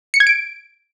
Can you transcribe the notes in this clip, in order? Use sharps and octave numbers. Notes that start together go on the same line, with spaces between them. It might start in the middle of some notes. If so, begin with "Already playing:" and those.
C#7
G#6
D7